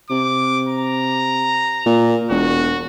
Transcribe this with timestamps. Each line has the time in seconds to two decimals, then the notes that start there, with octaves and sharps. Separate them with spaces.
0.10 C3 D6
0.68 A#5
1.86 A#2
2.30 E1 F#4